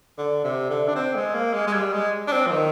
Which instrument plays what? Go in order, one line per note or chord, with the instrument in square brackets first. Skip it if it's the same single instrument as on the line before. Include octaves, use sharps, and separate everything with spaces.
[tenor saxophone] D3
C3
D3
D4
C4
G#3
A#3
G#3
G#3
G3
G#3
D4
C4
F3
D#3